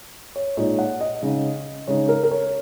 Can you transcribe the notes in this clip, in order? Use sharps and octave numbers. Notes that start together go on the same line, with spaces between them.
C#5
A#2 G#3 D#4 C#5
F#5
D#5
C#3 G#3 D#4
C#3 G#3 D#4 C#5
A#4
A#4
C#5